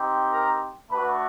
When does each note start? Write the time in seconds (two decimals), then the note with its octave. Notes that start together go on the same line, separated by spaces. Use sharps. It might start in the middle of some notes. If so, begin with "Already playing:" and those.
Already playing: C4 D#4 G4
0.31 A#4 A#5
0.91 A3 D4 F#4 B4 B5